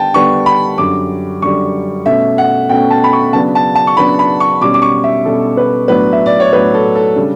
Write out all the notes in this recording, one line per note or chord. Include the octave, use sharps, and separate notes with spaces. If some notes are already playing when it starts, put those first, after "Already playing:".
Already playing: D3 G3 B3 G5 A5
D3 G3 B3 C#6
B5
F#2 D3 G3 D6
F#2 D3 G3 C#6
B2 A3 C#4 E5
F#5
B2 A3 C#4 G5
A5
B5
C#6
C#3 F#3 B3 D4 A5
A5
A5
C#6
C#3 F#3 B3 D4 B5
B5
C#6
B2 G3 C#4 D6
D6
C#6
E5
B2 G3 C#4 A4
B4
A2 F#3 B3 D4 B4
E5
D5
C#5
A2 F#3 B3 D4 B4
A4
A4
C#3 G3 D4